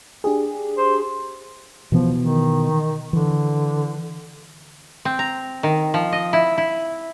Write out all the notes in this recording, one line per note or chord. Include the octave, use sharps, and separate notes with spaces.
D4 G4 G#4
C5
B2 E3 F3 B3
D#3
D3 E3
C4
A#5
D#3
F3
D#5
E4
E4